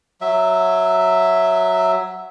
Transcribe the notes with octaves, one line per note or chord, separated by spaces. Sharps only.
F#3 E5